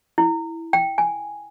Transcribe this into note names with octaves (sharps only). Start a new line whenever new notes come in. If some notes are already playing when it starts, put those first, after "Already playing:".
E4
G5
G#5